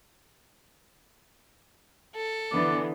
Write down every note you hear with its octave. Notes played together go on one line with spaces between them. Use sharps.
A4
D3 E3 B3 D5